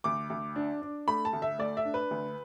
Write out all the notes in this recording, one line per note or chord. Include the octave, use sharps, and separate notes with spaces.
D2 D6
D2
D4
D4
A3 B5
A5
D2
E5
A3 D5
E5
D4
B4
D2